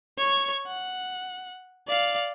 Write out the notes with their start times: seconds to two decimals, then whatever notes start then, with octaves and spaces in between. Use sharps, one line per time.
0.18 C#5 C#6
0.67 F#5
1.88 D5 F5